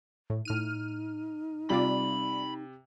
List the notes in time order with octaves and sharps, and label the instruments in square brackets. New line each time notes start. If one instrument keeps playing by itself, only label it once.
[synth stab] A2
[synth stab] A2 F6 D#7 [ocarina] D#4
[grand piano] C3 [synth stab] G3 F4 D5 [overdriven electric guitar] B5